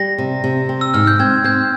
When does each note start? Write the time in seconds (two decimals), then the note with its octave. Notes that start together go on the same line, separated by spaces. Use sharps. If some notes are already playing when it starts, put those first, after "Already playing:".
Already playing: G3 A#6
0.18 C3
0.44 C3
0.69 C4
0.81 E6
0.94 G#2 F6
1.07 G6
1.19 C4 G#6
1.44 C4 G6